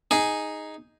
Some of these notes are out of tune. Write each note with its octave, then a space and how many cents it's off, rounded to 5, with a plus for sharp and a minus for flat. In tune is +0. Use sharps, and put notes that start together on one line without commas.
D#4 +0 G#4 +0